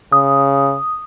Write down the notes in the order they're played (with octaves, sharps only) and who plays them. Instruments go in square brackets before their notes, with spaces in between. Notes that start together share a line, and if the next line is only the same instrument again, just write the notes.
[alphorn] C#3 [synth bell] D#6